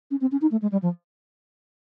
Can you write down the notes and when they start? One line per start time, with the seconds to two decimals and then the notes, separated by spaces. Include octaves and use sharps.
0.11 C#4
0.21 C4
0.32 C#4
0.41 D#4
0.51 A3
0.62 G#3
0.72 G3
0.82 F3